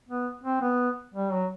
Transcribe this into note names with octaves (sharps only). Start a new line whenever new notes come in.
B3
C4
B3
G3
F#3